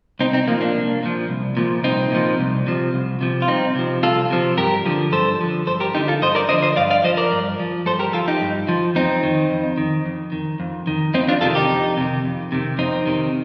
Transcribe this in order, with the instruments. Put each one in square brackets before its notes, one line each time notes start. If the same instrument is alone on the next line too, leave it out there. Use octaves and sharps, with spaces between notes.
[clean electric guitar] C2 C4 D#4
C4 D#4
A#2 F3 A#3
A#3 D4
C2
A#2 F3
C2
A#2 F3
C2 C4 D#4
A#2 F3
C2
C3 F3
C2
C3 F3
F4
C2 C4 D#4
C3 F3
C2 F4 A4
C3 F3
G2 G4 A#4
D3 F3
G2 A4 C5
D3 F3
G2 A4 C5
G4 A#4
D3 F3 D#4 G4
F4 A4
G2 C5 D#5
A#4 D5
D3 F3 C5 D#5
C5 D#5
G2 D5 F5
D5 F5
F3 C5 D#5
A#4 D5
G2
F3
G2 A4 C5
G4 A#4
F3 F4 A4
D#4 G4
G2
F3
F2 C4 D#4
D#3
F2
D#3
F2
D#3
F2
D#3
F2 C4 D#4
D4 F4
C3 D#3 F4 A4
D#4 G4
F2
C3 D#3
F2
C3 D#3
F2 C4 D#4
C3 D#3